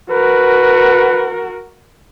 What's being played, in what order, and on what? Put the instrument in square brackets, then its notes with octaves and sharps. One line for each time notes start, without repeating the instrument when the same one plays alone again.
[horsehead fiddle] F#4 A#4 [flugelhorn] B4